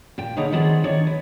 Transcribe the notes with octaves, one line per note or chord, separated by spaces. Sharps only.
A#2 G5
D3 A#3 D#4 G#4 B4 C#5
D#3 B3 C4 G#4 D5
D#3 D4 C#5
B4